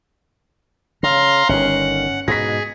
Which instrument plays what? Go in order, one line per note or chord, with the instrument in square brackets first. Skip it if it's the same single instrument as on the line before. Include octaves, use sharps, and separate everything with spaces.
[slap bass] C#3 [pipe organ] F5 A#5 C6
[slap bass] G1 D#3 [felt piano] C#4 [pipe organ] F#5
[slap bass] G#2 B2 [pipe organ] G#4 [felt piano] A#6 B6